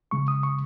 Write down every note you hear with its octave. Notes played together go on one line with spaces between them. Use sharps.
C#3 G#3 C#6
D#6
C#6